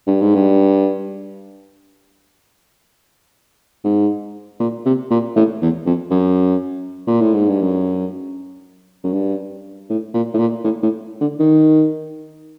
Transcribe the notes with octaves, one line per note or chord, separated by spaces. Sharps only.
G2
G#2
G2
G#2
A#2
C3
A#2
A2
E2
F2
F#2
A#2
A2
G#2
G2
F#2
F#2
G2
A2
A#2
A2
A#2
A2
A2
D3
D#3